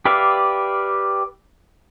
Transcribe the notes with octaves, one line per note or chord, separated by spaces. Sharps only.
G4 B4 D5 E5 F5